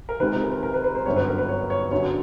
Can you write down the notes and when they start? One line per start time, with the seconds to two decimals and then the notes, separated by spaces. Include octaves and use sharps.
0.09 A#4
0.20 C#2 C3 D#3 B4
0.42 A#4
0.63 A#4
0.74 B4
0.84 B4
0.95 C5
1.06 G1 F#2 D3 C#5
1.16 B4
1.28 A#4
1.38 B4
1.49 C#5
1.70 C#5
1.91 F#2 D3 F#3 C#5